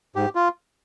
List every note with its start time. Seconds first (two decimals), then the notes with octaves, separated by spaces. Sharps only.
0.16 G#2 G4
0.35 F4